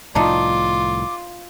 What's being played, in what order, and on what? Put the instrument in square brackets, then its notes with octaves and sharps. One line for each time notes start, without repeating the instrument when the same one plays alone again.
[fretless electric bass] C2 A2 F3 [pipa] D4 D#4 [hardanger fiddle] F4 [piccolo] D6